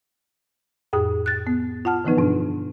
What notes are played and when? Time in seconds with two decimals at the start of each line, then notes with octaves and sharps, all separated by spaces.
0.93 F2 A2 G#4 D#6
1.26 F#6 A6
1.47 B3
1.85 F4 F#5 A5 F6
2.04 D3 E3 F3 B3 D#4 B4
2.18 G2 B2 D4